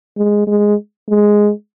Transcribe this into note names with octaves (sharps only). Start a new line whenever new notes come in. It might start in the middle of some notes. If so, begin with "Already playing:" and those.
G#3
G#3
G#3